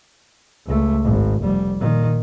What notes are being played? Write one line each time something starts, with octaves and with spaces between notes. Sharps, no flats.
C#2 A3
G#1
F1 G3
A#2 D#3